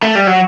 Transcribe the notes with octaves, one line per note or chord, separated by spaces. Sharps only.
A3
G3
F#3